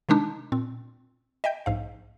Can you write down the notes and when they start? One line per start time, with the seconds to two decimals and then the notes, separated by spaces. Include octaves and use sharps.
0.09 C3 D#3 G#3 D4 D#4
0.52 A#2 C4
1.44 D#5 E5 G5 G6
1.66 A#1 G#2 F5